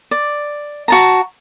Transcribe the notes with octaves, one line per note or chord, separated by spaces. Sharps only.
D5
F#4 A5 A#5